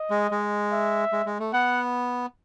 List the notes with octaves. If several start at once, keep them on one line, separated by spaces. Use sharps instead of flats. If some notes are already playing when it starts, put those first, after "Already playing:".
Already playing: D#5
G#3
G#3
E5
G#3
G#3
A3
B3 F#5